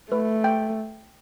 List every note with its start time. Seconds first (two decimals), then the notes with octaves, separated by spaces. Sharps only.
0.11 A3 B4
0.44 G5